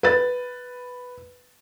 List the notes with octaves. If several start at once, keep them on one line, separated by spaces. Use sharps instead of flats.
B4 A6